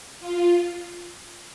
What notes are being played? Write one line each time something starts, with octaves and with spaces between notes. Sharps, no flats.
F4